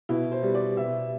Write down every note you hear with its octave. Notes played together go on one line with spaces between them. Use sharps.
B2 E4
C5
G3
D5
B2 E5